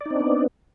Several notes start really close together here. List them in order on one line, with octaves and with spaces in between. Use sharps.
D5 D#4 C4 D4 B3